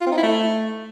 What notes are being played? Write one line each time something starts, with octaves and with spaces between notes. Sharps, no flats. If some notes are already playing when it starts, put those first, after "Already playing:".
F4
C4
D#4
E4
A3